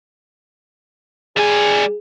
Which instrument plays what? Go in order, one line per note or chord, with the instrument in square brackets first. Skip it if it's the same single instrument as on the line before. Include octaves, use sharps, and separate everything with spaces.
[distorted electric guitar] G3 G#5 [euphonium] G#4